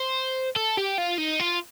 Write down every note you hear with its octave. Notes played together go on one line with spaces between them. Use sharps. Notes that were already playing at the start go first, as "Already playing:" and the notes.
Already playing: C5
A4
G4
F4
D#4
F4